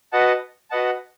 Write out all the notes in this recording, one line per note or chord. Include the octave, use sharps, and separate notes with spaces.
F#4 B4 D#5 F#5 A5
F#4 B4 D#5 F#5 A5